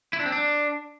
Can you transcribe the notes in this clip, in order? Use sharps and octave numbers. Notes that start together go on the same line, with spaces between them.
E4
D4
C4
D4